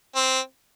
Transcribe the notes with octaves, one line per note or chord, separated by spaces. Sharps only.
C4